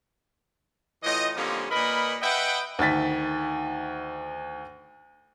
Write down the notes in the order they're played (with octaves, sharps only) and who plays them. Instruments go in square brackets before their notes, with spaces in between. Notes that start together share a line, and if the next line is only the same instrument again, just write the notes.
[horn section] A2 E3 F4 D#5
D3 F3 G3 A#3 C4 C#4
A#2 A#4 B4 D#5 B5
B4 D#5 E5 F#5 G5
[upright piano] D2 D#3 A6 B6